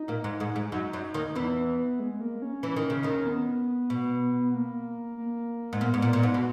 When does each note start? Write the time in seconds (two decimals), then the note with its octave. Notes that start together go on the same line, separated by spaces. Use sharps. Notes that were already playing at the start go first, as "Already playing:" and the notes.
Already playing: D#4
0.08 A#2 A#3
0.24 G#2 G#3
0.40 G#2 G#3
0.56 G#2 G#3
0.72 F#2 F#3 D#4
0.93 F#2 F#3
1.14 D#2 D#3
1.35 E2 E3 B3
2.00 G#3
2.21 A#3
2.42 C#4
2.63 E3
2.76 D#3
2.90 C#3
3.03 D#2 D#3
3.26 B3
3.90 B2
4.54 A#3
5.17 A#3
5.73 G#2
5.81 A#2 B3
5.94 G#2
6.02 A#2
6.13 A#2
6.23 G#2
6.34 B2